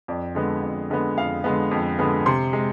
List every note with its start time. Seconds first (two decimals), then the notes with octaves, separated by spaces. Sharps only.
0.08 F2 D5
0.35 D3 G#3 B3
0.63 F2
0.90 D3 G#3 B3
1.18 F2 F5
1.44 D3 G#3 B3
1.71 F2
1.99 D3 G#3 B3
2.26 C3 C6
2.53 G#3